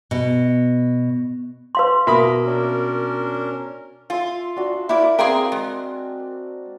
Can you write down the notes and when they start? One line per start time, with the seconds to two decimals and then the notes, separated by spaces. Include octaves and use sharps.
0.11 B2
1.75 B4 F5 C6
2.07 B2 A#3 E5 B5 D#6
2.45 C#4 D4 A#4
4.10 F4 E5 G#5
4.57 D4 F#4
4.89 A#3 E4 F#4 D5 D6
5.19 C4 G#4 A#4 F5 G5 C6 D6 E6
5.52 G#3